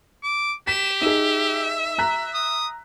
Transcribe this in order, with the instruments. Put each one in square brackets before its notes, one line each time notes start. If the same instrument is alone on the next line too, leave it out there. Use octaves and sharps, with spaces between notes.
[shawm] D6
[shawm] G4 [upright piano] B6 [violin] E7
[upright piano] D#4 G#4 [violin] E5
[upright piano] A#5 F#6 B6
[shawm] D#6